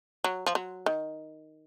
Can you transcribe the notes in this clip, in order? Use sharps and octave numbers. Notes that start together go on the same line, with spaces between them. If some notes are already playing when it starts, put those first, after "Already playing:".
F#3
F3
F#3
D#3